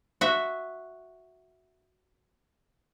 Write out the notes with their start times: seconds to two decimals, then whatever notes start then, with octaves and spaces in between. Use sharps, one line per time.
0.21 F#4 E5